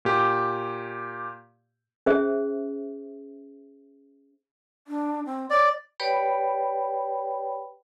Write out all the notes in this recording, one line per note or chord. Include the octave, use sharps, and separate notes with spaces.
A#2 G4
C#4 G#4 C5 E5
D4
C4
C#5 D5
G4 B4 C#5 D5 G5 B5